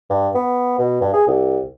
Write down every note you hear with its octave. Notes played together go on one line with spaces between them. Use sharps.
G2
B3
B2
G2
G#4
C2